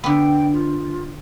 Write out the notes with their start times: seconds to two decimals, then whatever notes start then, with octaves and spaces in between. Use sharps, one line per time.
0.04 D3 B3 G5
0.53 F4